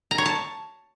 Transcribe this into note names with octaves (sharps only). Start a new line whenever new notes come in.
A#5
C#5
A5